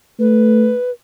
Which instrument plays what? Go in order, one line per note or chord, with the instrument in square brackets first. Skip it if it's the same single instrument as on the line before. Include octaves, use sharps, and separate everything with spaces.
[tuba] A3 [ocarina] B4